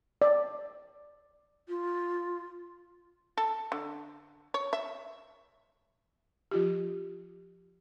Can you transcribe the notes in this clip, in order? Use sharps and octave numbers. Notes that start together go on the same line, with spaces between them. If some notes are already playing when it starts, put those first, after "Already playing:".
D5
F4
A4
D3
C#5
E5
F3 F4 G4